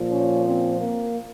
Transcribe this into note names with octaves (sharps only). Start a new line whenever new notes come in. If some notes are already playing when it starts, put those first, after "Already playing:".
Already playing: A#2 F3
C#4
C4
A#3